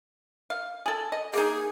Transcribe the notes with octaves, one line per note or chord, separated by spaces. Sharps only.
F5
G#4 A4
D#5
A#3 D#4 G#4